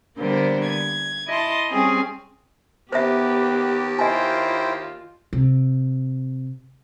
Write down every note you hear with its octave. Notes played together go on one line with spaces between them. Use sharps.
D3 G3 A#3 B3 C5
G#6
E4 D#5 A5 C6
G3 C4 C#4 G#4
D#2 B3 G4 B4 C5 E5
E4 F4 C5 D#5 G5 G#5
C3